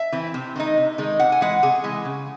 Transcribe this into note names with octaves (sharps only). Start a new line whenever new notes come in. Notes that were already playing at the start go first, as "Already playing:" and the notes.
Already playing: E5
E3 C4
C3
D#3 G#3 D#4
C3
D#3 G#3 D#4
C3 F#5
G#5
E3 G#3 F#5
C3 G#4
E3 G#3
C#3